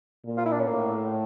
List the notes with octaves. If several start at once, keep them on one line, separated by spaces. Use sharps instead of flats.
A#2
F4
E4
D4
C#4
A2 A#3